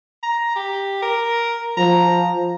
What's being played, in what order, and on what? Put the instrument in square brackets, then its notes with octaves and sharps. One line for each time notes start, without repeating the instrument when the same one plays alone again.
[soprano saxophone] A#5
G4
A#4
[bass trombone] F3 [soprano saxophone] A#5